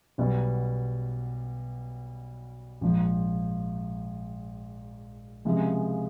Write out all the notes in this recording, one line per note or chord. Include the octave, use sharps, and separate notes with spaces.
B1 B2 G3 B3
A#1 G#2 F3
C#2 C3 F3 G#3